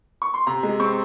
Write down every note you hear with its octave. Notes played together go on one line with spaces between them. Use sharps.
C#6
C6
C3 A#5
G#3
C4 C#6